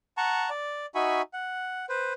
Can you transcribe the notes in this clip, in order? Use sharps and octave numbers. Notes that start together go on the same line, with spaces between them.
F#5 A5 A#5 C#6
D5
D#4 F#4 E5 G#5 B5 C#6
F#5
B4 C5